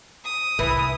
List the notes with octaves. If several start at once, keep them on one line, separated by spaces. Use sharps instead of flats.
D#6
C2 A2 E3 E4